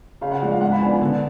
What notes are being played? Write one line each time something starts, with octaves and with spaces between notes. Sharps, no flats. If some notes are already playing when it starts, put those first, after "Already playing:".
C#3 F5
F#5
F3 G#3 D4
F5
G#2 F#5
B5
F3 B3 D4 G#5
D3